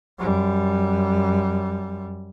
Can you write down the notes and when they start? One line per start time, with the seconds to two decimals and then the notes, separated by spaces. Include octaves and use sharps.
0.19 F#2 G3